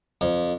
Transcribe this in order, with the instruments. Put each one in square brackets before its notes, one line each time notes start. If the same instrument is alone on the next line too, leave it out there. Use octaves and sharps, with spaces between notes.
[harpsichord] F2